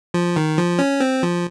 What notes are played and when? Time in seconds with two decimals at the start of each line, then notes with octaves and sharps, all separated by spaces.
0.14 F3
0.36 D#3
0.58 F3
0.79 C#4
1.00 C4
1.23 F3